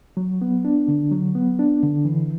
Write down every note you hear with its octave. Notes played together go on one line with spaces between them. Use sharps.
F#3
B3
D4
D3
F#3
B3
D4
D3
E3